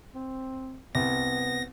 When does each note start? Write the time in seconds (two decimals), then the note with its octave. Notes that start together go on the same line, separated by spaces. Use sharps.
0.15 C4
0.95 C2 B3 A#6